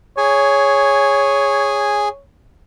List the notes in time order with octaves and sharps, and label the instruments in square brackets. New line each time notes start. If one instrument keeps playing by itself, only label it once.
[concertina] G#4 G#5 [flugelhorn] C#5